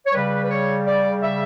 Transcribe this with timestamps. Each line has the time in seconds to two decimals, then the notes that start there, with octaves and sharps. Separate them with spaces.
0.07 C#5
0.14 C#3 G3 B4
0.45 B4
0.51 C#5
0.87 D5
1.23 E5